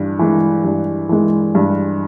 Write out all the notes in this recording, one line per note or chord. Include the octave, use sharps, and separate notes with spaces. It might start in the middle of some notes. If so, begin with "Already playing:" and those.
Already playing: G2 E3
E3 G#3
G2
E3 G#3
G2